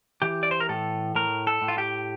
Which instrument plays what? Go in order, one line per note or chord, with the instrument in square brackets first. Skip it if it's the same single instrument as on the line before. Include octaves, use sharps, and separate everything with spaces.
[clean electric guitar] E3 G4
D5
C5
A#4
A2 A4
A2 A#4
A4
A2
F4
G4